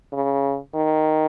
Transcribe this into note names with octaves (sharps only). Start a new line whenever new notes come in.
C#3
D#3